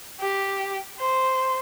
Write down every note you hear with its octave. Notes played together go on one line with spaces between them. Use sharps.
G4
C5